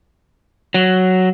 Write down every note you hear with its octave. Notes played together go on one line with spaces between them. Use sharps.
F#3